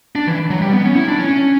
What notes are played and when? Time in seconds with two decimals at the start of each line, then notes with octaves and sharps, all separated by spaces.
0.15 D4
0.27 E3
0.50 F#3
0.61 G3
0.73 B3
0.85 C#4
0.96 E4
1.08 D4
1.19 C#4